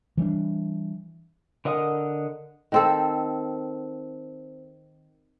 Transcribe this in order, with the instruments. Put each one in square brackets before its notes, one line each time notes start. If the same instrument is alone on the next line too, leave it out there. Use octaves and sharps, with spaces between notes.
[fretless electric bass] E3 G3 A#3 D4
[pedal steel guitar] D3 A#4 D#5 F#5 D#6
[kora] D#3 C4 A4